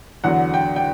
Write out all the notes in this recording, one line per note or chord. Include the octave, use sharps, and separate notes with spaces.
E2 D3 F#3 F#5
G5
G5